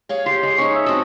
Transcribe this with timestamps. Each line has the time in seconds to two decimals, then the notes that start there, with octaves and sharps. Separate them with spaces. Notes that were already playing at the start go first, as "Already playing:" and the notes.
0.09 G#4 C#5 F5
0.26 G4 C6
0.43 G#3
0.58 C#4 D#4 C#6
0.75 E5
0.86 C4 F#4 A4 D#5